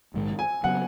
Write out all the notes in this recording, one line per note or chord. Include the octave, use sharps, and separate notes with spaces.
A#1 G#2 D#3 G#3
G#5
C#3 F#3 B3 F#5